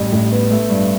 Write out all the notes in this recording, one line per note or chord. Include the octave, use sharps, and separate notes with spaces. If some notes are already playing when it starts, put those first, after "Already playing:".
Already playing: A1 G3
A2
B3
A3
G2